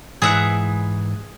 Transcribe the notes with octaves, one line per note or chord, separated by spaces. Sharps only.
G#2 E3 G#4 E5 F#5